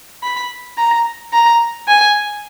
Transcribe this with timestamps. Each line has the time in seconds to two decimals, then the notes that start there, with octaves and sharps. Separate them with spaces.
0.23 B5
0.78 A#5
1.33 A#5
1.88 G#5